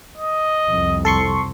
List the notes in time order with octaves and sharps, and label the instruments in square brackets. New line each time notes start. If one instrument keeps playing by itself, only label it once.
[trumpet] D#5
[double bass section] C2 F2
[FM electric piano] A4 C6 C#6